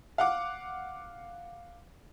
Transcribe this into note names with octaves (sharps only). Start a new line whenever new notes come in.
F5 F#5 D6